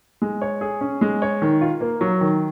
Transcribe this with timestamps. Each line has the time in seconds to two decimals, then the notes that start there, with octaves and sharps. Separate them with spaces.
0.22 G#3
0.42 C#5
0.61 G#4
0.81 C#4
1.01 G#3
1.22 C#5
1.42 D#3
1.61 F4
1.81 A#3
2.01 F#3
2.21 D#3